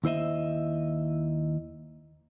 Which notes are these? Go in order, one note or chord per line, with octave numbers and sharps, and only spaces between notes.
D#2 E4 C5 D#5 E5